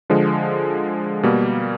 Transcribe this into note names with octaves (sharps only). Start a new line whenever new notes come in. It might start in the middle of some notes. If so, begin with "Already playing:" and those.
D3 F3 G#3
B2 G3 A#3